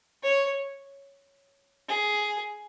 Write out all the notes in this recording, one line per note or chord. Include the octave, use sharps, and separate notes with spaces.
C#5
G#4